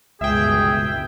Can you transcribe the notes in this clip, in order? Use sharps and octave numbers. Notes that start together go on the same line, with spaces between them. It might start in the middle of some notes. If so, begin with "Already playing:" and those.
G1 C#2 B2 G#4 E5 G5